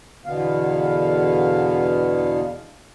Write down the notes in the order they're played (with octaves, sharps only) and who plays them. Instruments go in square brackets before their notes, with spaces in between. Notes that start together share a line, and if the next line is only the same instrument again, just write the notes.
[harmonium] E2 B2 D3 B3 F5